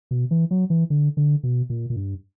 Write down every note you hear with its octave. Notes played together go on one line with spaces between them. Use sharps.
B2
E3
F#3
E3
D3
D3
B2
A#2
A#2
G2